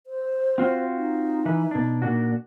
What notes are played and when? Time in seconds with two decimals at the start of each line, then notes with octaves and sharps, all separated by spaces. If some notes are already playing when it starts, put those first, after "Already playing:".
0.07 C5
0.58 C4 F4 F#4
0.96 D#4
1.46 E3 B4
1.71 B2 D4
2.02 A#2 D4 F#4